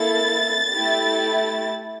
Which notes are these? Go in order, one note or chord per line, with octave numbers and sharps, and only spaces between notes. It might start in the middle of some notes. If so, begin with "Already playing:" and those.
Already playing: A#3 E4 A4 A6
A3 E4 G4